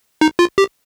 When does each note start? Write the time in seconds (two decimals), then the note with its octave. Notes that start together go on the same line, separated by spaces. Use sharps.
0.21 D#4
0.39 F4
0.58 G4